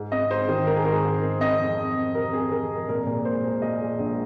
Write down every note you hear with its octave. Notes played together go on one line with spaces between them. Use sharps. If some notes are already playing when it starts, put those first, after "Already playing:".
Already playing: G#2
C4 D#5
G#2 C5
D#3
C4 A#4
G#4
G#2 A#4
G#2
C4
C4 D#5
F2
C4
F2
C3 A#4
C4 G#4
F2 A#4
F2
A#2 A#4
A#2
G#3 C5
G#3
A#2 D#5
G#3
A#1